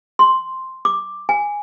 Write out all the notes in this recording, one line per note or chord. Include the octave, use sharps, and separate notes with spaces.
C6
D6
G#5